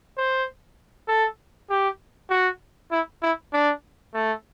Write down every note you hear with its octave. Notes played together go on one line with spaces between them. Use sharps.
C5
A4
G4
F#4
E4
E4
D4
A3